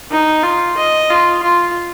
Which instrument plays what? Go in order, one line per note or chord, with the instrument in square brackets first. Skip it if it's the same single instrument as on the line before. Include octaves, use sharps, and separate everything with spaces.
[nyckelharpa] D#4
F4
D#5
F4
F4